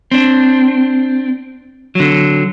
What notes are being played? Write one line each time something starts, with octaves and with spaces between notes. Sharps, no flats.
C4 D4
D3 F#3